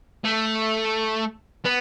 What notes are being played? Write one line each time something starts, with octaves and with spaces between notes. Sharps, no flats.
A3
B3